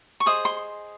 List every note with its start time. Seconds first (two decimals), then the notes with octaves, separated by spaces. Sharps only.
0.20 C#6
0.26 G#4 C5 D#5 D#6
0.45 C6